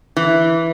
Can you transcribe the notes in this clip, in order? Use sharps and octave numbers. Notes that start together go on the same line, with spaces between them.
E3